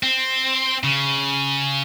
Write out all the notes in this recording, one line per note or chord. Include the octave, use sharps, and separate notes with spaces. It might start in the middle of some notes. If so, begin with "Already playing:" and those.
C4
C#3